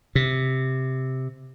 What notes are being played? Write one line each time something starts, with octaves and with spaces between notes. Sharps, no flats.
C3